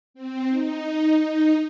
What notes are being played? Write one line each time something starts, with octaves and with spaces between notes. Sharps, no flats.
C4
D#4
D#4